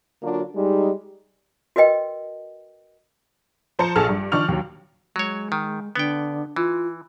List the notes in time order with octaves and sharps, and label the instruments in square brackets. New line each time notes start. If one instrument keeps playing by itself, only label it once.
[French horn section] D3 F#3 A#3 D4 F4 F#4
G3 G#3 D#4
[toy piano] F#4 A#4 B4 D#5 G5
[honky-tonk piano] F3 C5 A5 A#5 C#7
A#1 G#4 A4 A5 F6
G2
D#3 F3 D4 C#6 F6 F7
D#2 F#3
[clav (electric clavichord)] F#3 C#5 [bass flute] G#3
[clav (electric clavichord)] D#3
[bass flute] D3 [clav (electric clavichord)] B3 G5
[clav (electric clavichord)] E3 [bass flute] F4